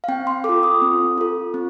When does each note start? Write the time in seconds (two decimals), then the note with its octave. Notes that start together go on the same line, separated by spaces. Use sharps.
0.04 F5
0.08 C4 G5
0.27 C6
0.44 F4 A4 D6
0.63 D#6
0.82 C4
1.18 F4 A4
1.54 C4